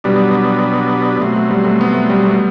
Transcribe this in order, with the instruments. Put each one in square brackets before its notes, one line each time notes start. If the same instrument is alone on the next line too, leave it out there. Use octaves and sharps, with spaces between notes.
[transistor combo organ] B2 F#3 B3 D4 [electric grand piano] G3
[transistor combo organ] B2 F#3 C4 [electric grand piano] A3
[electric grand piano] A3
G3
A3
B3
A3
G3
A3